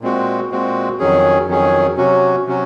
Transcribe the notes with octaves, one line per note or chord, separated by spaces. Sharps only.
A#2 G#3 C4 F#4
A#2 G#3 C4 F#4
F2 D#3 F#3 C#4 G#4
F2 D#3 F#3 C#4 G#4
C3 F#3 C#4 F#4
C3 F#3 C#4 F#4